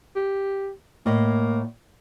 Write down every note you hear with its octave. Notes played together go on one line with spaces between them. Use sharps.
G4
A2 A#3 D#5